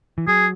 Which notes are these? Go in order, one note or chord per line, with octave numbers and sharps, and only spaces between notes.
E3
F#3 G#4